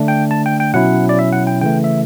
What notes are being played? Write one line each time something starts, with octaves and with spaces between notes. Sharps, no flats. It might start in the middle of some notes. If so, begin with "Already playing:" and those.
Already playing: D3 A3 D4
G5
A5
G5
G5
B2 F#3 C#4 E4 F#5
D5
E5
F#5
G5
C#3 E3 A3 G5
E5